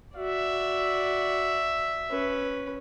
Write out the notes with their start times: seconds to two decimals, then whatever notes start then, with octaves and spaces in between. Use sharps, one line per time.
0.16 F#4 D5 E5
2.11 C#4 B4